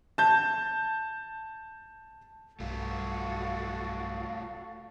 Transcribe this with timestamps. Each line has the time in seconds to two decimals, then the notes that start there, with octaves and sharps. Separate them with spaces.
0.18 A5 G6
2.60 B1 G2 A3 F4 F#4 A4 F5